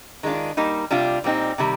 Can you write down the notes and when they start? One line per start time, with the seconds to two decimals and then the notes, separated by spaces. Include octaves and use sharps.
0.23 D#3 G#3 D4 F4
0.57 G3 A#3 D#4
0.91 C3 G3 D4 F4
1.24 A#2 G3 C4 D#4
1.58 C3 D#3 G3